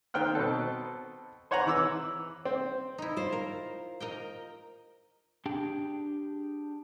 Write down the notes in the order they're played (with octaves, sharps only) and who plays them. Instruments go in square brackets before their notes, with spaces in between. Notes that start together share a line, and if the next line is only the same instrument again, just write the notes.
[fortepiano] D#3 C4 G5 F6 F#6
B2 C4 A4
C5 C#5 F#5 G#5 A#5
E3 D6 E6
C4
[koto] D#4 E4
[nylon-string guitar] F4 C5
[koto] A#4
A#4 D#5 G5
[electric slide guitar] D4 G4 G#4 G5